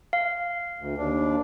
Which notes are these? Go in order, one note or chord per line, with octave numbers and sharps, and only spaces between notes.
F5
D2
D#2 D4